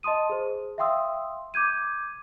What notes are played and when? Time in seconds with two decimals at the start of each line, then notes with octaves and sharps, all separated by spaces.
0.03 D#5 A5 C6 D#6 D#7
0.29 G#4 C5
0.78 E5 F5 G5 C6 D#6 E6
1.54 D6 G6 G#6 D#7